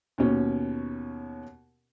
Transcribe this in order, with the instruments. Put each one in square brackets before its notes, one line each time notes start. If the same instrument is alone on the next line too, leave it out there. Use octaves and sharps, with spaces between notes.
[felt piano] D#2 B2 C#4